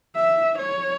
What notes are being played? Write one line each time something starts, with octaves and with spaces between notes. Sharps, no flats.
E5
C#5